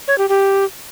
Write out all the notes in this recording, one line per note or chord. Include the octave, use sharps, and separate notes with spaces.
C#5
G4
G4